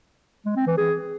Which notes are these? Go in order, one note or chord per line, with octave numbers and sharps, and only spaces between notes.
G#3
C4
E3
G#4